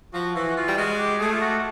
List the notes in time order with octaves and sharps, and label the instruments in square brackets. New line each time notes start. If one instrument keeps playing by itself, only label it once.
[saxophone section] F3 [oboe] F#4
[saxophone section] E3 [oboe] F#4
[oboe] F#4
[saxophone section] E3 [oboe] F4
[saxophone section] G3
[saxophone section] G#3 [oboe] F#4
[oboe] G4
[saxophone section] A3 [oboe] G#4
[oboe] F4
F#4